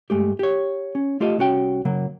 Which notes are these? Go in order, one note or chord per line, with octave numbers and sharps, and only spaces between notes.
G2 G#3 A3 G4
G4 C#5
C#4
A3 F4 G4 A4 D#5
C2 C#4 F#4 G5
C#3 F#3 A#3